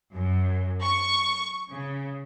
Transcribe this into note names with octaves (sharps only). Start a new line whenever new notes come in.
F#2
C#6
C#3